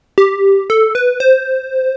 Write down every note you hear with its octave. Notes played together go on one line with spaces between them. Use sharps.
G4
A4
B4
C5